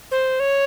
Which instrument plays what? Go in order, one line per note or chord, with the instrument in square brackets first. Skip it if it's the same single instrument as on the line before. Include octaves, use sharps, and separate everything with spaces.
[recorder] C5
C#5